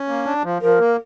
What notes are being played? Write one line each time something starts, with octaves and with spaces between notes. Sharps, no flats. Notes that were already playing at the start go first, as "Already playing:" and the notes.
Already playing: C#4
A#3
D4
F3
F3 A#4
A#3